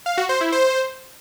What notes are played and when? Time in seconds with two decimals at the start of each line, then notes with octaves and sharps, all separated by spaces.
0.06 F5
0.18 F#4
0.29 C5
0.41 E4
0.52 C5